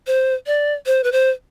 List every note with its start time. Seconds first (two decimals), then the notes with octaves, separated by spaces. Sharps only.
0.07 C5
0.47 D5
0.86 C5
1.04 B4
1.12 C5